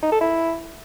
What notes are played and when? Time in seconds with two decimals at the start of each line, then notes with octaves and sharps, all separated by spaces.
0.03 D#4
0.12 A4
0.21 E4